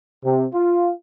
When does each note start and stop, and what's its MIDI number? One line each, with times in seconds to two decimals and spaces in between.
0.24 0.46 48
0.53 0.91 65